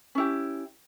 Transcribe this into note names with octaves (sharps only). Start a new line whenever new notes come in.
C#4 E4 G4